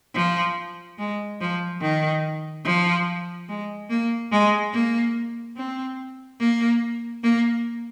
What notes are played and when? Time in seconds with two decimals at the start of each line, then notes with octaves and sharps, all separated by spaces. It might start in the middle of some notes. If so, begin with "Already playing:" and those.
0.15 F3
0.98 G#3
1.40 F3
1.82 D#3
2.65 F3
3.49 G#3
3.90 A#3
4.32 G#3
4.73 A#3
5.57 C4
6.40 A#3
7.23 A#3